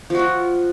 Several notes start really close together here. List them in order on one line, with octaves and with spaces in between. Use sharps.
F3 F#4 F4